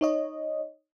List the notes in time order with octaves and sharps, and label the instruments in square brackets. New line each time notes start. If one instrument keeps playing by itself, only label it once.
[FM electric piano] D#4 C#5 D#5